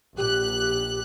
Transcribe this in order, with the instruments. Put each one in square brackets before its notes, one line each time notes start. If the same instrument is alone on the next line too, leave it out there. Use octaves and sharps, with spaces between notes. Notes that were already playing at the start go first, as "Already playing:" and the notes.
[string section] A#1 F#6 [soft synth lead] G4